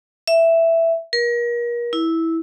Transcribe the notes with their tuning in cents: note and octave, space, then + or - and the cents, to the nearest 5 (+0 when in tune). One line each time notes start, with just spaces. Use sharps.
E5 +5
A#4 +35
E4 -10